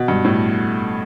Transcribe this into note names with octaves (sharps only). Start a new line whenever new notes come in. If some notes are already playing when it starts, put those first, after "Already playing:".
Already playing: B2
G2
A2